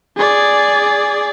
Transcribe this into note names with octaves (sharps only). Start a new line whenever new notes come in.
G#4 D5